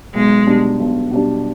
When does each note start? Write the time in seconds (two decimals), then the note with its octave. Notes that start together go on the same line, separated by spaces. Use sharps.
0.14 B1 G#3
0.47 B2 G3 D4
0.79 B1
1.11 B2 G3 D4